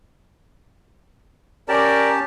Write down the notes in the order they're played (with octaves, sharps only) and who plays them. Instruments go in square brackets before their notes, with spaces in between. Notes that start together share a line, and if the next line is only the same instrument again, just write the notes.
[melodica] C#4 G4 A5 [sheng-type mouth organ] A#4 D5